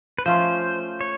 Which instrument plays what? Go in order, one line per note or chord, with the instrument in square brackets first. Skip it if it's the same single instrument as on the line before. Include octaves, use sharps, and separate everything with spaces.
[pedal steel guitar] B4
[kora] F3 A3 C#4 F4 [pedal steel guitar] C5
[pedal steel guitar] C#5